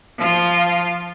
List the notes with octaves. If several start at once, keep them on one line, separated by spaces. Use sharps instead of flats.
F3 F4